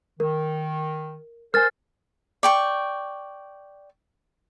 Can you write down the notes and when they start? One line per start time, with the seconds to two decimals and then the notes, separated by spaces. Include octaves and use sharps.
0.20 D#3 A#4
1.54 A4 A#4 C5 G#5 F6 A6
2.43 D5 G5 C#6